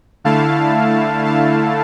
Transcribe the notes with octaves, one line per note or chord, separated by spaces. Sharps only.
D3 A3 E4 F5 A5
F5 A5